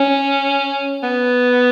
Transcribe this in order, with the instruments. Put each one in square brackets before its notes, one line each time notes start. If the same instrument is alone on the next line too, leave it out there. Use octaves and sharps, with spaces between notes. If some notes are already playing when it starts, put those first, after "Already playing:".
Already playing: [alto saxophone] C#4
B3